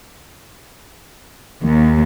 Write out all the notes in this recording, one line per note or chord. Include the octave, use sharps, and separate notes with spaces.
D#2